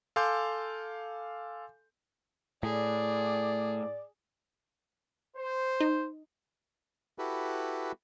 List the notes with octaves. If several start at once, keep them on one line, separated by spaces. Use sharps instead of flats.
A4 F5 G#5 C6 D6 G6
A2 G#4 D5
C5
D#4
E4 F#4 G4 A4 B4